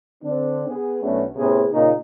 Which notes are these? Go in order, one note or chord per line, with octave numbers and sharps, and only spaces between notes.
D3 C4 D4
B3 G#4
B1 A3 B3 C#4 D4 F#4
A2 C3 B3 C#4 G#4
A#2 C#3 A#3 D#4